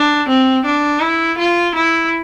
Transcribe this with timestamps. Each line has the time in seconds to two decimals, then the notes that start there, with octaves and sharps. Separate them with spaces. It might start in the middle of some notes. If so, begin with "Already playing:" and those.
Already playing: D4
0.29 C4
0.65 D4
1.02 E4
1.38 F4
1.76 E4